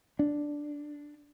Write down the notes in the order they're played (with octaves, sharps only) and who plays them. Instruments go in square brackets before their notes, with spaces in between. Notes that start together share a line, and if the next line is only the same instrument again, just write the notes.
[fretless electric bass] D4